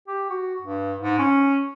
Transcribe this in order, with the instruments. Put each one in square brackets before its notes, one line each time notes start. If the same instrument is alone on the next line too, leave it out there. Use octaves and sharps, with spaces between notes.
[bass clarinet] G4
F#4
G2
G#2
C#4